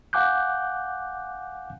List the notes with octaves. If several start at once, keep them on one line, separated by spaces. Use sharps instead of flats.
F5 F#5 G#5 D6 F#6 G6